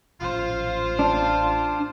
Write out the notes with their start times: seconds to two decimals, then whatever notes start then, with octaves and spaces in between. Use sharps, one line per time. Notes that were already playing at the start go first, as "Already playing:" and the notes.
0.21 A1 A#2 C#4 F4 C5
0.99 D4